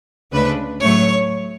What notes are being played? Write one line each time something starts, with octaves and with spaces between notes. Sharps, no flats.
D2 C#3 G#3 D4 B4
A2 F#3 A3 C#5